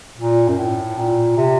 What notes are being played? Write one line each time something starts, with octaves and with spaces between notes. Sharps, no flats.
A#2
F#2
A2
A#2
C3